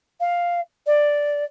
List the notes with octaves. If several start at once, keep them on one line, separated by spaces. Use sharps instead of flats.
F5
D5